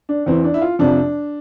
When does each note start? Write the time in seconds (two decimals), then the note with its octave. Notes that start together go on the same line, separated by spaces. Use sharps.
0.09 D4
0.26 E2 E3 C4
0.44 D4
0.54 E4
0.62 F4
0.79 F2 C3 F3 D4